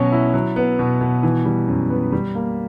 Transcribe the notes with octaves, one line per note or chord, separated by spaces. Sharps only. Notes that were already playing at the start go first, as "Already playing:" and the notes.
Already playing: B2 F#3 C#4
E4
F#3
B3
B2
B2
E3
G3
F#2
B3
G3
A#3